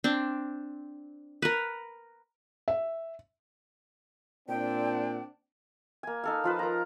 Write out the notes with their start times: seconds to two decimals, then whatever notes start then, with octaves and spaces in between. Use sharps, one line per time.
0.04 C4 D4
1.42 A#4 B4
2.68 E5
4.49 A#2 C4 D4 G5
6.03 A#3 G#5
6.24 D#4 A4 F5
6.44 F3 F4 B4 A5
6.59 A#4 A#5